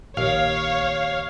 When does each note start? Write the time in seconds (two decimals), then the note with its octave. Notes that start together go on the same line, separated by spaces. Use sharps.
0.17 A#1 D#2 C#5 F5